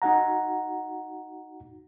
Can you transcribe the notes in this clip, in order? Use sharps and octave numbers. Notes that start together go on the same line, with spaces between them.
D#4 F#4 F#5 A#5